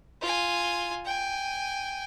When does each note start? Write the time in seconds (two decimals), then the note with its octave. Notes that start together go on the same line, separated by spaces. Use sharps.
0.21 F4 G#5
1.06 G5 G#5